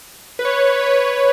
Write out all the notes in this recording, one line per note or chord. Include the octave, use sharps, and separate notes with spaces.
B4
C#5
B4
C#5
B4